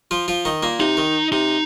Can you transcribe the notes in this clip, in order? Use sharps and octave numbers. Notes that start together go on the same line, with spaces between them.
F3 F4
F3 F4
D#3 D#4
A#2 A#3
C3 D#4
D#3
C3 D#4